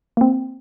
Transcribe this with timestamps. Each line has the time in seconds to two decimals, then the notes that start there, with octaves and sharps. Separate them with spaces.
0.17 A#3
0.21 C4